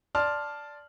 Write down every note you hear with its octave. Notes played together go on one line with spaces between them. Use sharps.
D5 A5 C6 F6